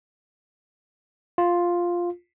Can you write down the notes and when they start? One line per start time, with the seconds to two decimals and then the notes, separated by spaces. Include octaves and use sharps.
1.38 F4